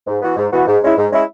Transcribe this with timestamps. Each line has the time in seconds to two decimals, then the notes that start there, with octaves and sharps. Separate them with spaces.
0.07 G#2
0.22 E3 B3 F#4
0.36 G#2
0.52 E3 B3 F#4
0.67 G#2
0.82 G#3 C#4 E4
0.97 G#2
1.11 G#3 C#4 E4